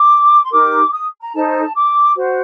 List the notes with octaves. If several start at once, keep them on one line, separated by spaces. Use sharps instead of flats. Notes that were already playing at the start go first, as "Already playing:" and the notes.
Already playing: D6
C6
D#4 G4 A#4 D6
D#6
A#5
D#4 A4 C5 A5
D6
F#4 C5